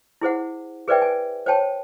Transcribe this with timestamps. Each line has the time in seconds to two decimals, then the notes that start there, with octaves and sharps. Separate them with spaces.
0.21 E4 G#4 C5 F#5
0.88 G#4 B4 C5 D5 E5 G5
1.02 G#5
1.46 C5 C#5 G5 A5